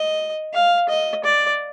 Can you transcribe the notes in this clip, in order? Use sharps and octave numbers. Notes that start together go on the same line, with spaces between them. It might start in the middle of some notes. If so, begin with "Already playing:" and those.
Already playing: D#5
F5
D#5
D5